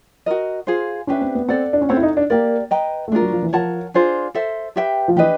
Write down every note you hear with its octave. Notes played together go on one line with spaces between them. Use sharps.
F#4 A#4 D#5
F4 G#4 C5 F5
C#4 D4 G4 B4 E5
C4
B3
C4 A4 D5 F#5
D4
C#4
C4 A4 C#5 F#5
E4
D#4
D4
A#3 G4 A#4 D5
B4 D#5 G5 A#5
A3
G#3 D4 F4 A#4
F#3
F3
E3
F3 A#4 C#5 F#5 A5
D4 F4 G#4 C5
A4 C5 E5
G4 B4 E5 G5
F3
E3 D4 G4 B4 D#5